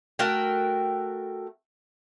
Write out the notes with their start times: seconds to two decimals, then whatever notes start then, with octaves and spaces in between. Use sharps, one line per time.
0.19 A3 F#4 A#4 G5